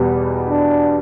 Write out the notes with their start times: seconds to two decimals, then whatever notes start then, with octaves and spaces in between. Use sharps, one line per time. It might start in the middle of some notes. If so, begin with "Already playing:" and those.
Already playing: E2 B2 G3 B3
0.49 D4